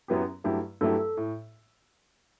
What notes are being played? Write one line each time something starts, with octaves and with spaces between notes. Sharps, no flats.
F#2 F#3 B3 E4 G4
G2 F#3 A3 E4 G4
G2 F#3 A3 E4 G4 A4
A2